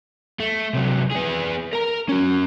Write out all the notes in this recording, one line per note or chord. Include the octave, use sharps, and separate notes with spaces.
A3
C3 F#3
B3 G#4
A#4 A#5
C#4 F#4